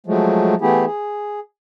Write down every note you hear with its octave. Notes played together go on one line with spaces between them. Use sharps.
F3 F#3 G#3 A3
E3 A3 B3 E4 G4 G#4
G#4